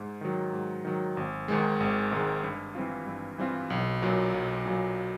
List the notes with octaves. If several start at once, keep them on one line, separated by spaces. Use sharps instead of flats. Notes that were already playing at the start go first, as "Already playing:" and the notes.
Already playing: G#2
D#3 F#3
G#2
D#3 F#3
G#1
G#2 D#3 G#3
G#1
G#2 D#3 G#3
G2
E3 G3 C4 F4
G2
E3 G3 C4 F4
B1
A#2 F#3
B1
A#2 F#3